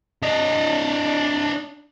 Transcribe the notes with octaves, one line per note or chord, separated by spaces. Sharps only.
D4 D#5